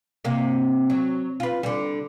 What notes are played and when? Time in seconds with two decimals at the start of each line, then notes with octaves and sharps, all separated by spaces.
0.25 C3 A#3
0.90 F#3
1.40 F4 B4
1.63 D3 G3